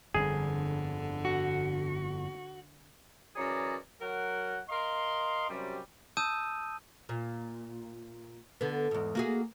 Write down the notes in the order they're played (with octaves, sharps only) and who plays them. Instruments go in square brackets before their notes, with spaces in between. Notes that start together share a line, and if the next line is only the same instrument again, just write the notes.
[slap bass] G1 F2 [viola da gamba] D3 [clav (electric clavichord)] G#4
[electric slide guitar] F#4
[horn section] F#2 E3 G#4 C#5 D5 A#5
F#3 A#4 F#5
A#4 D#5 F5 C6
F#2 C3 F#3 G3
[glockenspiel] A5 D#6 E6 G6 D#7
[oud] A#2
D3 B3
E2 G#2
A#3 F#4 G#4